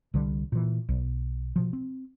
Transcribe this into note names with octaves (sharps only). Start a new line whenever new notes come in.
C2 D3 G3
A#2 E3
B1
B2 F3
C4